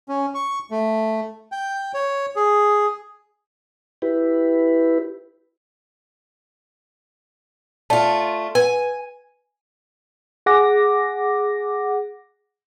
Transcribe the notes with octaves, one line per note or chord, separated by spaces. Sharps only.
C#4
C#6
A3
G5
C#5
G#4
E4 G4 B4
A3 F4 D5 A5
B4 G#5
G#4 F#5 D6 A#6